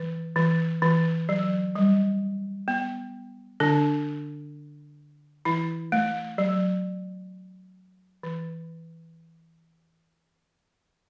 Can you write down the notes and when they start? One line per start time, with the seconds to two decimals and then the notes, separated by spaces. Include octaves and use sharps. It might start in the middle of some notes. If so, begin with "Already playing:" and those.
Already playing: E3
0.36 E3
0.82 E3
1.29 F#3
1.75 G3
2.68 B3
3.60 D3 D4
5.45 E3 E4
5.92 A3
6.38 F#3
8.23 E3